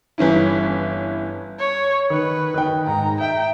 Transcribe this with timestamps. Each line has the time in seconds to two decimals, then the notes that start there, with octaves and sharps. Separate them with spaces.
0.18 G1 E3 C#4 E4
1.60 C#5
2.10 D#3 B4
2.54 D#3 G5
2.87 G#2 A#5
3.21 E5 G5